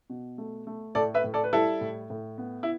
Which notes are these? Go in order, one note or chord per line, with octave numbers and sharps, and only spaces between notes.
B2
A3
A3
A2 A4 D5
B4 E5
A2
A4 D5
B4
G3 E4 A4
A2
A2
B3
E4